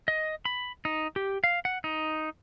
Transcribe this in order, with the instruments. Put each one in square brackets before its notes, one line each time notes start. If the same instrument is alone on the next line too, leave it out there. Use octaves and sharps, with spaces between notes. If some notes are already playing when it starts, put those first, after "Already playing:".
[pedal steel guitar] D#5
B5
D#4
G4
F5
F#5
D#4